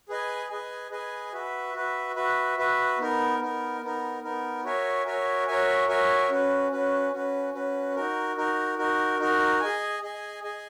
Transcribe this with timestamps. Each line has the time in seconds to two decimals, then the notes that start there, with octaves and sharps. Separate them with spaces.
0.09 G#4 B4 D#5 G#5
0.50 G#4 B4 D#5 G#5
0.91 G#4 B4 D#5 G#5
1.33 F#4 B4 E5
1.74 F#4 B4 E5
2.16 F#4 B4 E5
2.58 F#4 B4 E5
2.99 B3 D#4 A#4
3.40 B3 D#4 A#4
3.81 B3 D#4 A#4
4.22 B3 D#4 A#4
4.64 F#4 A#4 C#5 E5 G#5
5.06 F#4 A#4 C#5 E5 G#5
5.47 F#4 A#4 C#5 E5 G#5
5.88 F#4 A#4 C#5 E5 G#5
6.30 C#4 F#4 B4
6.71 C#4 F#4 B4
7.13 C#4 F#4 B4
7.54 C#4 F#4 B4
7.95 D#4 F#4 A#4
8.37 D#4 F#4 A#4
8.78 D#4 F#4 A#4
9.19 D#4 F#4 A#4
9.60 G#4 D#5 G#5
10.03 G#4 D#5 G#5
10.44 G#4 D#5 G#5